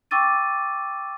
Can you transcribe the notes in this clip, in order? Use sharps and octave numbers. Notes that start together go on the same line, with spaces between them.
G5 C#6 D6 E6 A6 D#7